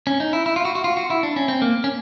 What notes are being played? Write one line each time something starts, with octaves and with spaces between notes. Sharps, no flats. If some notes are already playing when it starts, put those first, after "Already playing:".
C#4
D#4
E4
E4
F4
F#4
F#4
F4
F#4
E4
D4
C#4
C4
A#3
C#4